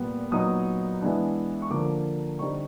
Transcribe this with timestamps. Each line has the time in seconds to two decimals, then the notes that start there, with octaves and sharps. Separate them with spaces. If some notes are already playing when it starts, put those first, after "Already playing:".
Already playing: A#2 G3 B3
0.31 A#2 F#3 B3 D#4 D#6
1.01 E3 G#3 B3 D4
1.62 C#6
1.70 D3 F3 A#3 D6
2.39 D3 G3 C4 D#4 C#6